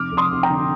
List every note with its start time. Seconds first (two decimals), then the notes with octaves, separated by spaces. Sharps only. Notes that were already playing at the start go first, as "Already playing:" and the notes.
Already playing: F1 D6 F6
0.12 F1
0.17 C6 D#6
0.31 F1
0.43 G5 A#5
0.50 D3